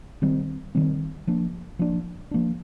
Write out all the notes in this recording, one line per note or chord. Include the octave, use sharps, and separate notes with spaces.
D#3 G3 C4
D#3 G3 C4
F3 A#3 D4
F3 A#3 D4
F3 A#3 D4